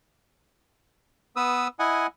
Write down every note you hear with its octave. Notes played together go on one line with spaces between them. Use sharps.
B3 B4 D#6 E6
E4 D#5 F#5 G#5